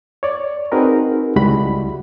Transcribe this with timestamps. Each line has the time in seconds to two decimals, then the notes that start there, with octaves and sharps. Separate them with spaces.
0.23 C#5 D5
0.72 C4 D#4 F#4 G#4 A#4 B4
1.36 C#2 G3 G#3 E4 F#4 B5